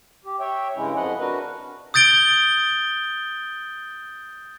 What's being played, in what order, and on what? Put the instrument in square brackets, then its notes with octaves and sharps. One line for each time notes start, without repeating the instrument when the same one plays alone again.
[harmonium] G4
C#5 E5 G5
G2 C#3 G#3 C#4 E4
F2 F3 E4 D#5 F#5
D4 F#4 A#4 B4
[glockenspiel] D#6 G6 A6 D7 G7